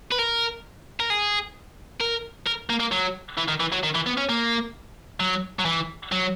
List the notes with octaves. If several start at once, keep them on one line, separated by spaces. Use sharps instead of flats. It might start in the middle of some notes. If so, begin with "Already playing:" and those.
B4
A#4
A#4
G#4
A#4
A#4
A#3
A#3
F#3
E3
D#3
E3
F#3
D#3
E3
B3
C#4
A#3
F#3
F#3
E3
F#3